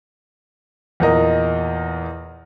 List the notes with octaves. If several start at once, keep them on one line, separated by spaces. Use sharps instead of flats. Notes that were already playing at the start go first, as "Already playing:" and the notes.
E2 A#2 A#4 D#5